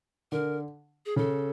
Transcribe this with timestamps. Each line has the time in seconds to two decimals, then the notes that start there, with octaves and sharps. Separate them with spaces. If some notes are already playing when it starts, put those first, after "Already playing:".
0.32 D3 A#4
1.06 G#4
1.16 C#3 A4